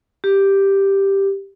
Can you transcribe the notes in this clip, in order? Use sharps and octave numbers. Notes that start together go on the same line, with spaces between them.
G4